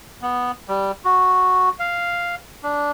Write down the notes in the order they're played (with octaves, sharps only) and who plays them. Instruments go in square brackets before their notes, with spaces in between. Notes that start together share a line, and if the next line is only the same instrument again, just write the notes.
[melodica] B3
G3
F#4
F5
D4